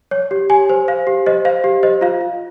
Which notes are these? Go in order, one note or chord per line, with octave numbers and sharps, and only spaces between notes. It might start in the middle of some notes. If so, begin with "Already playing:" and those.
C#5
G4
G4 G#5
C5
C5 F5
G4
C5 D#5
C5 F5
G4
C5 D#5
F4 F5
F4